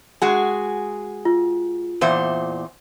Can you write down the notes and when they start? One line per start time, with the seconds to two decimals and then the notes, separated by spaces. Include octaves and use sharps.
0.22 G#3 F#4 G#4
1.25 F4
2.01 E2 A#2 C5